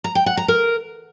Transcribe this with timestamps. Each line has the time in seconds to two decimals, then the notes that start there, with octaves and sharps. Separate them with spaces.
0.04 A#5
0.15 G5
0.26 F#5
0.37 A#5
0.48 A#4